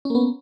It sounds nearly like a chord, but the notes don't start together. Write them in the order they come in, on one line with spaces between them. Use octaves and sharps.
C#4 A#3 B3